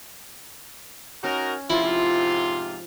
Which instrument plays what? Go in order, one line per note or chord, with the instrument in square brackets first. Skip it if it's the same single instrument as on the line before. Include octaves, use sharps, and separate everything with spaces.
[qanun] C#4 [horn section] D#4 F#4 A#4
[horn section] G#2 C3 F4 [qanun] F3 [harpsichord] E4